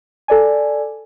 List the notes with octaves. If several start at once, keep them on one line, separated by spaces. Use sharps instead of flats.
A4 D5 G#5